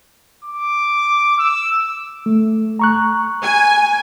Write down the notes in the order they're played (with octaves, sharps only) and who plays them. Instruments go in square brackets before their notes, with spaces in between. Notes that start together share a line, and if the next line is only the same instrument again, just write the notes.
[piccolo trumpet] D6
E6
[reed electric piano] A3
A#5 C#6 F#6
[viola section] G#5